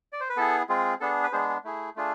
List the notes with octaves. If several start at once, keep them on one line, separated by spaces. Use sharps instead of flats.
D5
C5
B4
B3 E4 G#4 A4
G#3 C4 F4 G#4
B3 D4 G#4 A4
B4
G#3 B3 D4 G#4 C5
G#4
A3 E4 G#4
A3 D4 F4 G#4